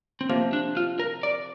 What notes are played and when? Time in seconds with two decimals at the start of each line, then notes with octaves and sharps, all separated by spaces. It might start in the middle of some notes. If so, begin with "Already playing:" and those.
0.21 C4
0.29 C3 F3 A#3
0.53 D4
0.77 F4
0.99 A#4
1.23 D5